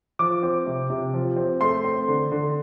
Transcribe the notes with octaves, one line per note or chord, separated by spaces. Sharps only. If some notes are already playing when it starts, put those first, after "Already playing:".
F3 D6
C4
C3
C3
F3
C4
A3 C6
C4
D3
D3